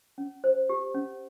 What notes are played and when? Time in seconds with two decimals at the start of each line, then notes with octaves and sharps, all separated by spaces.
0.18 C#4
0.44 C5
0.69 G4
0.95 C#4